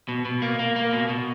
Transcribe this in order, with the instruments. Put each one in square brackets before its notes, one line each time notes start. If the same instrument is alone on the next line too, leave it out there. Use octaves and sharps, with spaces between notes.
[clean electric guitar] B2
B2
A#3
A#3
A#3
B2
B2